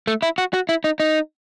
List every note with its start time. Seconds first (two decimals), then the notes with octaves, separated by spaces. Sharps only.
0.07 A3
0.22 E4
0.38 F#4
0.54 F#4
0.69 E4
0.84 D#4
1.00 D#4